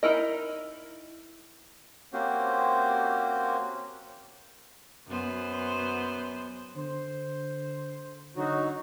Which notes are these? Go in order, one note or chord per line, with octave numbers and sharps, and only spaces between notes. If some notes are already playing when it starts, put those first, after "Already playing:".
D#4 E4 A#4 D#5
A#3 C4 C#4 F#4 G4 C5
F#2 B3 C5
D3 C5
D3 F#3 D#4 F#4